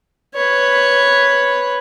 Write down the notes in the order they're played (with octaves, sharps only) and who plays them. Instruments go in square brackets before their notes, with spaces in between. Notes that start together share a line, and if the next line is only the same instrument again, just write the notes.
[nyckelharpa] B4 C#5